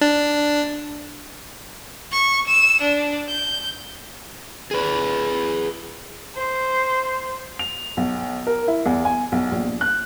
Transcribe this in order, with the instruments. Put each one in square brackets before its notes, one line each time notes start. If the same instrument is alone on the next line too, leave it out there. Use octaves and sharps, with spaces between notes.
[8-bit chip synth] D4
[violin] C#6
E6
D4
G6
[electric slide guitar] G#4 B4
[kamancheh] C5
[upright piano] F7
B1
A#4
E4
E2
G#5
B1
A#1
F#6